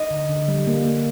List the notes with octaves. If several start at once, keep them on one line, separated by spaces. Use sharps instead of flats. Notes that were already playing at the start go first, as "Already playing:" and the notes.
Already playing: D#5
D3
D3
G3
A#3
A#3